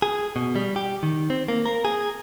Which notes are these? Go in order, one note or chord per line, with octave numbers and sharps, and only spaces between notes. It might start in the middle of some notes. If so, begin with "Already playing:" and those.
G#4
B2
G3
G4
D#3
C4
A#3
A#4
G#4